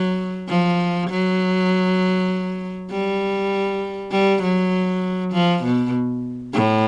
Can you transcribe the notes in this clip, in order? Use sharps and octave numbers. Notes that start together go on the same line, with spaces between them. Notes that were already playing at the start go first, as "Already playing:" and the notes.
Already playing: F#3
F3
F#3
G3
G3
F#3
F3
B2
A2